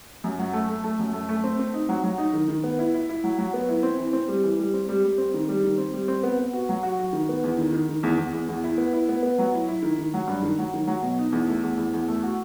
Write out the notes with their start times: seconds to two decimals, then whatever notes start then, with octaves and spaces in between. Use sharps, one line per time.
0.24 F#2
0.39 F#3
0.53 A3
0.69 A3
0.84 A3
0.99 F#2
1.13 A3
1.29 A3
1.44 C4
1.59 C4
1.74 D#4
1.89 F#3
2.04 F#3
2.18 D#4
2.33 D#3
2.48 D#3
2.64 B3
2.79 E4
2.94 E4
3.09 E4
3.24 F#3
3.38 F#3
3.54 B3
3.69 E4
3.83 C4
3.98 E3
4.13 C4
4.28 G3
4.43 E3
4.59 G3
4.74 C4
4.89 G3
5.04 G3
5.18 C4
5.34 D#3
5.48 G3
5.64 D#3
5.78 C4
5.93 G3
6.08 C4
6.23 B3
6.39 B3
6.53 F#4
6.69 F#3
6.83 F#4
6.99 F#4
7.13 D#3
7.29 B3
7.44 E2
7.58 D#3
7.73 D#3
7.89 D#3
8.03 E2
8.18 E2
8.33 E2
8.49 E2
8.64 E4
8.78 B3
8.93 E4
9.09 B3
9.23 B3
9.38 F#3
9.54 E4
9.68 E4
9.83 D#3
9.99 D#3
10.14 F#3
10.27 G2
10.43 D#3
10.59 F#3
10.74 D#3
10.87 F#3
11.03 B2
11.19 D#4
11.32 E2
11.48 A3
11.63 E2
11.77 E2
11.94 E2
12.08 A3
12.23 F#4